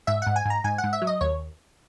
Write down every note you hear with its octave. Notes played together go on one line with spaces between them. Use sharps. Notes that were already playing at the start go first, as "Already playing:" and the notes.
G#2 E5
G#2 F#5
G#5
G#2 A#5
G#2 G#5
F#5
G#2
E5
F#3
D#5
D#2 C#5